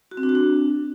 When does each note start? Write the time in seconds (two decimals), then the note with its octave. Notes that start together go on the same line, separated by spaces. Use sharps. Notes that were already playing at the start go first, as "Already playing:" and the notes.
0.11 F#4
0.17 C4
0.23 D4
0.29 F#4
0.35 D4